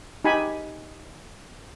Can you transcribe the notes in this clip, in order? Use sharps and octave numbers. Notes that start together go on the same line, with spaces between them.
D#4 G4 G#5 B5